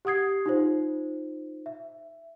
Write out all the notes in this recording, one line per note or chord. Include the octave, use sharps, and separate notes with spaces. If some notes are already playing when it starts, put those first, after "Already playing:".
G4 F#5 D#6 G#6 C7
D#4 F4 C5
E5